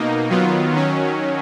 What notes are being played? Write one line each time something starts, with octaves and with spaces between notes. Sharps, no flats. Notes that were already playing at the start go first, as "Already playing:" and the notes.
Already playing: B2 A#3 D#4
D#3 F#3 B3 F4
D#3 F#3 C#4